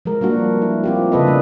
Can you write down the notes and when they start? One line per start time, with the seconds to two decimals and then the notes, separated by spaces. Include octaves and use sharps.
0.05 F3 G#3 A#4
0.21 G3 A#3 D4 F#4
0.62 E4
0.84 C4 F4 G4
1.12 C#3 A4 B4 D#5
1.27 C#3 A3 D4